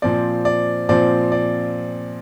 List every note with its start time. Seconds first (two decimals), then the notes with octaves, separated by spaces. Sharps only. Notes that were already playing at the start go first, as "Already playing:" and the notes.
0.02 A#2 F3 C4 D5
0.45 D5
0.89 A#2 F3 C4 D5
1.32 D5